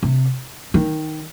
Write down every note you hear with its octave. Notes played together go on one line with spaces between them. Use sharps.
C3
D#3